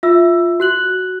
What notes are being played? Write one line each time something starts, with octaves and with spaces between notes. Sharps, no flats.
F4 E5 E6
F#4 F#6 F#7